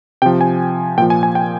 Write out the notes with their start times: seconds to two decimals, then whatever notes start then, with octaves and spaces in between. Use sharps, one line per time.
0.22 C3 F3 G5
0.41 G#5
0.98 A#2 G5
1.02 F3
1.10 G#5
1.23 G#5
1.35 G5